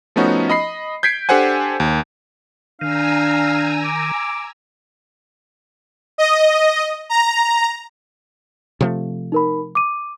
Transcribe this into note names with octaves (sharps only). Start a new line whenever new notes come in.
F3 A3 B3 C#4 D#4 F#4
D#5 B5 C7
G6 G#6 B6 C7 D7
D4 G4 A4 C5 F#5 G#5
D#2
D#3 D4 F5 G#5 A#5 E6
D6
D#5
A#5
C3 F3 A3
D#4 A#4 B5
D6 D#7